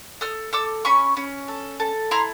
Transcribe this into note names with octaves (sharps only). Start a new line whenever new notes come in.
A4 D#6 F6
A4 D6 E6
C#4 B5 C#6
C#4
A4
A4
E4 A#5 C6